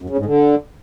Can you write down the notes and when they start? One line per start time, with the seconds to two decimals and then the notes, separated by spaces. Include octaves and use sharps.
0.02 F#2
0.10 C#3
0.18 G#2
0.25 D3